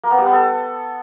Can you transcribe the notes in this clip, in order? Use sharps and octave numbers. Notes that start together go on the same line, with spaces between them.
A#3
B3
G3
B3
A4